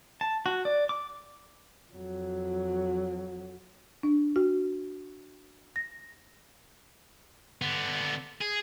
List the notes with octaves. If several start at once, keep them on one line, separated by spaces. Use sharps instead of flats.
A5
F#4
D5
D6
F2 F#3
D4
F#4
A#6
D3 B3
G#4